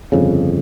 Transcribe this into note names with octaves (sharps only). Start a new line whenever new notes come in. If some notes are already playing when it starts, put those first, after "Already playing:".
G1 F2 C#3